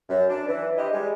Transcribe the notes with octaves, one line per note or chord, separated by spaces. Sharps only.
F#2
D4
E3
D4 E4 G4 B4 C5 D#5
G3 G#3